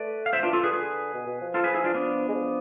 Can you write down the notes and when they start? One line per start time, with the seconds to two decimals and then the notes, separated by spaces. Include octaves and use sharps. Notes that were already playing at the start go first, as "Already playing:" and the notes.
Already playing: A3 B4 D5
0.26 F5
0.33 F3 C5 E5
0.43 E3 D4 F4
0.53 F4 A4
0.63 D3 G#4 B4
0.73 G#4 B4
1.14 B2
1.27 B2
1.41 F3
1.54 F4 A4
1.64 G#4 B4
1.74 E4 G#4
1.84 D4 F4
1.94 B3 D4
2.29 G#3
2.35 F3